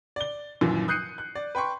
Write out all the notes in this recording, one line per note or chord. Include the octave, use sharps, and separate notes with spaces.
D5 G7
G#1 F#2 A#2 E3 F3
D#6 F#6 G6 C7 C#7 D#7
F#6
D5
B4 G5 C6 C#6